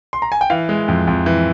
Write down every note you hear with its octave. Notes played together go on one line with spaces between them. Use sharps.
C6
A#5
G#5
G5
E3 F5
G#3
F2
F2
E3